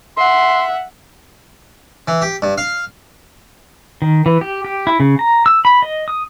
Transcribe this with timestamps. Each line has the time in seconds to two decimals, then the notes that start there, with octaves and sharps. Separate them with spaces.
0.17 E5 F#5 C6
2.08 E3
2.22 G4
2.42 G2
2.58 F5
4.02 D#3
4.26 E3
4.41 G4
4.65 G4
4.87 E4
5.00 C#3
5.19 A#5
5.46 E6
5.65 B5
5.82 D#5
6.08 D#6